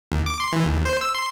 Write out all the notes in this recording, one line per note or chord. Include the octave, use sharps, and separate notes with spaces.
D#2
D6
C6
E3
D#2
C5
E6
C6